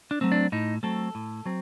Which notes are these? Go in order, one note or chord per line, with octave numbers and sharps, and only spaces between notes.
D4
F#3 A3 C4
D4
A2 D#4
F#3 A3 C4 A4
A2
F#3 C4